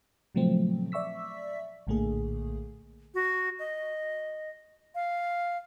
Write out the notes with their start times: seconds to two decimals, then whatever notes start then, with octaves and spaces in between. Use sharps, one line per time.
0.35 A#2 C#3 F3 F#3 A3 C4
0.92 D5 E5 C#6 E6 B6
1.87 A#1 A2 D3 A3 A#3 G#4
3.14 F#4
3.59 D#5
4.95 F5